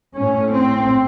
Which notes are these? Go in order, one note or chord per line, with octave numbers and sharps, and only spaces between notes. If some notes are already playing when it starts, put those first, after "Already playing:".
A2 C#4
C4